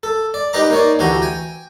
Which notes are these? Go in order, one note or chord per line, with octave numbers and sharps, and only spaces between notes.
A4
D5
D#4 G4 B4 D#5 A#5 D6
A#3 D#4 C#5 D5
D2 E3 F#4 G4 G#5 A#5
G5 G#5